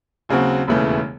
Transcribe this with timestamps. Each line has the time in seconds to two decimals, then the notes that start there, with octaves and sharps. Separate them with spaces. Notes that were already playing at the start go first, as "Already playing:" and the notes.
0.29 D#2 C#3 F#3 C4 F#4
0.68 E1 D#2 C#3 E3 A3